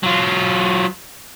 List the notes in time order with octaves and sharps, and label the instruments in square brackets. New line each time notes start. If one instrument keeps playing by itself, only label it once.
[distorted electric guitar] F#3 F4